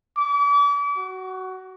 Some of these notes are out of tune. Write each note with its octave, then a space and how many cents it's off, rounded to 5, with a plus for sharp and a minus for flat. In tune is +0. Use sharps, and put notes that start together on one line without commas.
D6 -40
F#4 +15